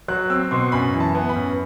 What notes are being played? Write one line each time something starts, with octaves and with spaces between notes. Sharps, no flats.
F#3 F#6
C4 E6
B2 C6
F#2 B5
E3
A5
B3
B5
F#2